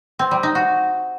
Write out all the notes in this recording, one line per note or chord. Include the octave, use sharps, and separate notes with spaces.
C4
G3
D#4
F#4